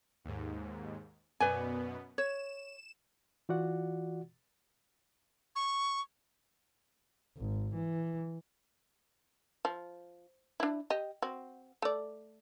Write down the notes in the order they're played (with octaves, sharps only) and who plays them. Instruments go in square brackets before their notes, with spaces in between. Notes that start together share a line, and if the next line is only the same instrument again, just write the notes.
[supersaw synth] D#2 G#2
[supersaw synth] F#2 B2 B3 [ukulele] B4 D5 G#5
[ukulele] C#5 [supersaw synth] E7
[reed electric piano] E3 F4 F#4 D5 F#5
[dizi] C#6
[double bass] G#1
E3
[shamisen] F3
D4 E4
G4 D#5
C4 F#4
A3 D5